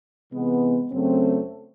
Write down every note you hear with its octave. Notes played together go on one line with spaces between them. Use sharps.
C3 E3 G#3 B3
F#2 C#3 F#3 A3 C4